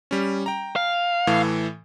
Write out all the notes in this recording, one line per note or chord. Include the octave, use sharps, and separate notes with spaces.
G3 C#4
G5 A#5
F5
A2 E3 A4